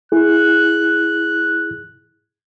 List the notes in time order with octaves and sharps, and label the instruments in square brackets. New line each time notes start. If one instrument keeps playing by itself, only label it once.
[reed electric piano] E4 G#4 [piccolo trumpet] F#6